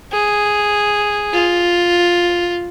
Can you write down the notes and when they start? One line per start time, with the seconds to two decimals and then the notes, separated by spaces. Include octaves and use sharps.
0.13 G#4
1.33 F4